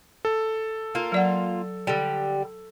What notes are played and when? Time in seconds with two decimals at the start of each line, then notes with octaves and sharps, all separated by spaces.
0.25 A4
0.95 A#3 F4
1.12 F#3 D5 F#5
1.87 D3 G3